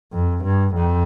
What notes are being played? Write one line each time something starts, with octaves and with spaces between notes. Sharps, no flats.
F2
G2
F2